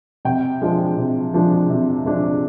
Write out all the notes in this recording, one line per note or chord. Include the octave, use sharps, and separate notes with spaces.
C3 G5
F3 G#3 D4
C3
F3 G#3 D4
C3
F3 G#3 D4